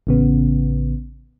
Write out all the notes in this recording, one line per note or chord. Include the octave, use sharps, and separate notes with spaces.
A1 C#3 B3